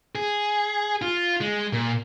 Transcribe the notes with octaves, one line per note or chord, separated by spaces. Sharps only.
G#4
F4
G#3
A#2